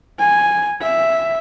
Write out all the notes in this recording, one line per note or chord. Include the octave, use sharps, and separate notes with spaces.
G#5
E5